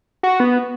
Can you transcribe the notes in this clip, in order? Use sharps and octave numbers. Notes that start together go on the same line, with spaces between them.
F#4
B3